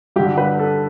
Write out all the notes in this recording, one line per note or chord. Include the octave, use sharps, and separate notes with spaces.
G2 D3 G4
B4
A4